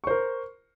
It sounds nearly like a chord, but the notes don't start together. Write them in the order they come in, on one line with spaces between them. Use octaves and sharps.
C#6 C5 A#4